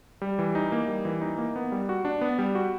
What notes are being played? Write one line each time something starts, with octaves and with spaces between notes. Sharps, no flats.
G3
E3
D#4
A#3
G3
E3
D#4
A#3
B3
G3
F#4
D4
B3
G3
F#4